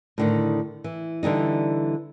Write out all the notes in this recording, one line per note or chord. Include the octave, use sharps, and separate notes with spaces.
A2 D3 D#3
E3
D3 E3 G3 D#4